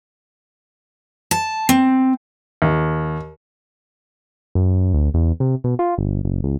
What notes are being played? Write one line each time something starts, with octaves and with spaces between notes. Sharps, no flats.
A5
C4
D#2
F#2
D2
E2
C3
B2
F4
G1
F#1
C#2